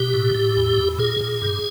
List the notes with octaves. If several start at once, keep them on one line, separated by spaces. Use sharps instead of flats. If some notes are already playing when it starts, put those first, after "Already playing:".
Already playing: B2 G4
A2
A2
E2
E2
A#2 G#4
A#2
G2